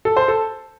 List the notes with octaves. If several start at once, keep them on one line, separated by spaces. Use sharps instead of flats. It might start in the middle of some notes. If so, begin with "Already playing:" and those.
A4
C5
A4